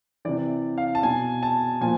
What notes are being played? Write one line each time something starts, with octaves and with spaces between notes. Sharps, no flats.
C3 E3 D5
F5
A5
B2 G#5
A5
A#2 F3 G#5